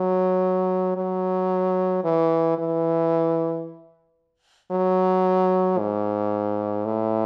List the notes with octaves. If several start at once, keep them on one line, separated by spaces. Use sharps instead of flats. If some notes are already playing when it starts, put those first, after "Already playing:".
Already playing: F#3
F#3
E3
E3
F#3
G#2
A2